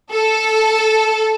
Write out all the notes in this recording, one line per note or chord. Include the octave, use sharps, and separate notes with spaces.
A4